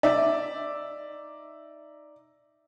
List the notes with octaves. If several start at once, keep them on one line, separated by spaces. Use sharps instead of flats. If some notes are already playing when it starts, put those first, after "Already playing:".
D#4 D5 E5